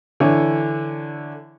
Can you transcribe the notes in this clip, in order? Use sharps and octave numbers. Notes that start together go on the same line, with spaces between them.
D3 E3 C#5